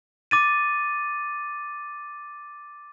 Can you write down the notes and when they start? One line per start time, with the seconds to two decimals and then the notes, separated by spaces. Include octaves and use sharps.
0.31 D6 A6 D#7